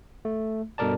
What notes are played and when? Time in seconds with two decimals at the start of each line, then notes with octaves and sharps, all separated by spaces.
0.25 A3
0.78 G2 B2 A4 A#4 D5 A5